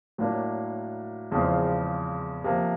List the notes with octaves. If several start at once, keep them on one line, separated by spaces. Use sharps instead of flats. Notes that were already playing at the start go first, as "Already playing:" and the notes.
A2 F#3 A#3 D4
E2 C#3 F3 G#3 C4
C3 F3 A#3